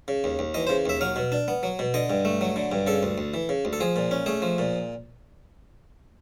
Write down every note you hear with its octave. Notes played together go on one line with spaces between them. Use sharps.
C#3
D#2
D#2
E3 D#5
C#3 C5
D#2 E5
F#3 F5
B2
D4
B3
F#3
B2
D3 D#5
G2
A3
F#3
D3
G2
C#3 A4
D2
D2
E3
C#3
D2
A4
F3 G#4
A#2
C#4
A3 G#4
F3
A#2